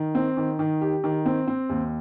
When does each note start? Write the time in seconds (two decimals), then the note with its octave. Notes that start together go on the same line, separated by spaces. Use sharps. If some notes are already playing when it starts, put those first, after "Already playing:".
Already playing: D#3
0.15 C4
0.37 D#3
0.59 D#3
0.81 G4
1.04 D#3
1.26 C4
1.47 C4
1.69 D#2